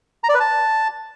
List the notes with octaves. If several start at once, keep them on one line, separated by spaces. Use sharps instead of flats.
A#5
D5
B4
A5